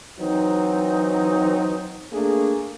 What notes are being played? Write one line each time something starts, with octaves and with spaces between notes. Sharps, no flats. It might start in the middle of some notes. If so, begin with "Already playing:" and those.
E3 F#3 C4 D#4
A3 A#3 D4 G#4